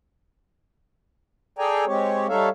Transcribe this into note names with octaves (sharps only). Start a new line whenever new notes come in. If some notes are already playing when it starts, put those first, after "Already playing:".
G#4 A4 D5 G5 G#5 A#5
G#3 C4 G4 C#5
G3 D#4 A4 C#5 E5 F5